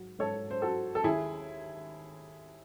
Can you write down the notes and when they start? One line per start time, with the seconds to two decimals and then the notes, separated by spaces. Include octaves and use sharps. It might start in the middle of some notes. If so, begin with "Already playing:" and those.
Already playing: G#2 F#3
0.19 G#2 A4 C#5
0.51 C5
0.62 F#3 F#4 A4
0.95 A4
1.04 D#2 E4 G#4